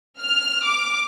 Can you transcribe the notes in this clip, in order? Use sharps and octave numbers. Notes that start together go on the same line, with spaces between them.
F6
D6